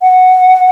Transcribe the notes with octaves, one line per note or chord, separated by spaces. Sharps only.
F#5